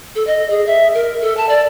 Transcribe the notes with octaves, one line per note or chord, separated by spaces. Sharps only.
A4
D#5
G#4
E5
A#4
A4
A5
D5